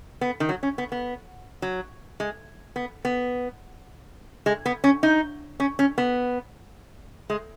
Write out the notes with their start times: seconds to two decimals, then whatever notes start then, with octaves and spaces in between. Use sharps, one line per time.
0.21 B3
0.40 D#3
0.49 F#3
0.63 C#4
0.78 B3
0.92 B3
1.62 F#3
2.20 G#3
2.76 B3
3.05 B3
4.46 G#3
4.66 B3
4.84 C#4
5.03 D#4
5.60 C#4
5.79 C#4
5.98 B3
7.30 G#3